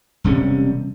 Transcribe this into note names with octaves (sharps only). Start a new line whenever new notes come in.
E1 C3 G3 C#4